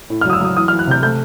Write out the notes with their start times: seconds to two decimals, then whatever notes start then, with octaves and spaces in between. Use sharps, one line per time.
0.10 A2
0.21 F6
0.26 F#3 D#6
0.33 E6
0.41 F#3 D#6
0.56 E3 D#6
0.68 F6
0.72 E3
0.79 F#6
0.87 C3 G6
1.02 A3 G6